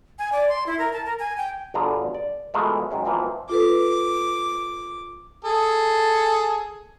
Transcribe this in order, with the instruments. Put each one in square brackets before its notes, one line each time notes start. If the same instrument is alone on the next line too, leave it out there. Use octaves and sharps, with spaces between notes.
[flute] G#5
D5
C6
E4
A#4
A5
A#4
G#5
G5
[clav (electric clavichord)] G1 B2 D3 F4 G#4 A#5
D5
B2 E3 F3 G#3 A3 A#4
F#2 D#3 G#3 C#4
B2 E3 F3 A#3 C4
[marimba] F4 A4 B4 [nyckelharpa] D6
[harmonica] G#4 A4